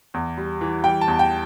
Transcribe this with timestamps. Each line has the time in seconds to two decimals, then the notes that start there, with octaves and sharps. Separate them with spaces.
0.14 E2
0.38 G3
0.61 E3
0.83 G3 G5
1.01 A5
1.08 E2
1.19 G5